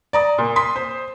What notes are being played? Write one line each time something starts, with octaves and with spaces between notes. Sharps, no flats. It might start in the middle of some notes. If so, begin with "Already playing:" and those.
D5 A#5 D#6
A#2
C6 D#6 B6
C5